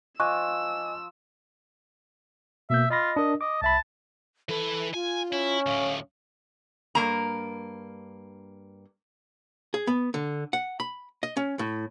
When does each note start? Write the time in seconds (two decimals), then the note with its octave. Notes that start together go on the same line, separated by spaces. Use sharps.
0.20 F3 D#5 G#5 C#6 D6 E6 F#6
2.70 B2 A#3 E5 G6
2.90 F4 D#5 B5 A#6
3.16 D4 A#4 D#5
3.41 D#5 D6
3.62 C2 E5 A5 B5
4.49 E3 A4 B4
4.94 F4 G#5
5.32 C#4 E4
5.66 D2 A2 F5
6.95 G2 A#3 A#5
9.74 G#4
9.87 B3
10.14 D3
10.53 F#5
10.80 B5
11.23 D#5
11.37 C#4
11.59 A2